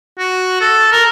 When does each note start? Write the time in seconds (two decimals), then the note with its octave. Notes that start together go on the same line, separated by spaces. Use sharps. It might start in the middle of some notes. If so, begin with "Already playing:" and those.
0.19 F#4
0.61 A4
0.92 A#4